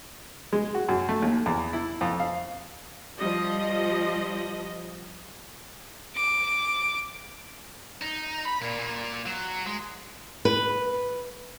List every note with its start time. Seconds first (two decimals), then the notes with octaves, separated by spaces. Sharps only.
0.53 G#3
0.75 F#4
0.89 F#2
1.09 A3
1.22 D#2
1.46 E2
1.73 E4
2.01 F2
2.20 F5
3.18 F3 G3 D#5
6.16 D6
8.02 D#4
8.46 B5
8.62 A#2
8.79 A#2
9.26 F#3
9.66 G#3
10.45 B4